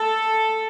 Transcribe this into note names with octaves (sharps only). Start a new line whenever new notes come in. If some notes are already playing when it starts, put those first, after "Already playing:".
Already playing: A4